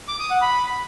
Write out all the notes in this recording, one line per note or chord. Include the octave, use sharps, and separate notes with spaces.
D6
D#6
F#5
B5